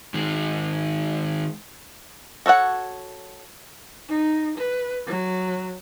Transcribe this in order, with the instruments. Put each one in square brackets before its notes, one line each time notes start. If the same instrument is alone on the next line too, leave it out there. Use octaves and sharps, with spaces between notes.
[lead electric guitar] D#3 G#3
[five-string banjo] F#4 A4 C#5 F#5
[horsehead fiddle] D#4
B4
F#3